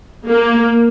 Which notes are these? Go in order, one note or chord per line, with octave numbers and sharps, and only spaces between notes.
A#3